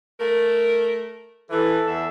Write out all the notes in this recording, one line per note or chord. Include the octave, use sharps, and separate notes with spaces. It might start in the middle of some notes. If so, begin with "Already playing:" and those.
A3 A#4
E3 A4
E2 E3 E5